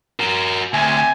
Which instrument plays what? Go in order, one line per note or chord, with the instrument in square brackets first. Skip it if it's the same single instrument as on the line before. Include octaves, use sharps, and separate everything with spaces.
[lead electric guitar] F#4 A#4
[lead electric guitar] D2 [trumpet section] C4 E5 G#5